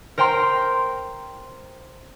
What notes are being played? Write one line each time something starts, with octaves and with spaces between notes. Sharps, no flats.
A#4 C5 G5 A#5 C6